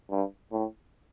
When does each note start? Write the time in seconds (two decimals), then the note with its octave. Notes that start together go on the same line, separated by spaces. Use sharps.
0.11 G2
0.52 A2